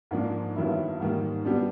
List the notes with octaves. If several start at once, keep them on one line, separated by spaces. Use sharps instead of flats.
G#2 F3 A#3 D4
G2 D#3 F#3 B3 E4
G#2 D#3 G3 A#3
B2 G3 B3 D4